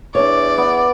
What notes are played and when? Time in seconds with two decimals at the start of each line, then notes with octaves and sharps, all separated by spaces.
0.15 E2 D4 C#5 D5
0.58 B3